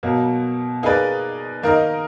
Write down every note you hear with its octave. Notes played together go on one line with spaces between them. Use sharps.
B2 F#3 A#3
A#3 D#4 G#4 B4 D5
D#3 A#3 D#4 A#4 D#5